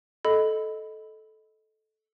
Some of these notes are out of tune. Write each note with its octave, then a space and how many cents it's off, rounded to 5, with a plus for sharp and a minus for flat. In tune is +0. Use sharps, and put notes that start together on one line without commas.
A4 -10 D#5 +0 B5 +10